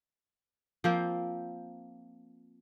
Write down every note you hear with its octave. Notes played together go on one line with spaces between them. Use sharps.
F3 A#3 C4